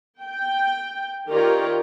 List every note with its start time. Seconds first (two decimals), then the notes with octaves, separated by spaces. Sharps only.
0.22 G5
1.29 D#3 F4 G4 A#4 C#5 D5